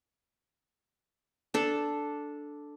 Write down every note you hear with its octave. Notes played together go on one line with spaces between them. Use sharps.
D4 A4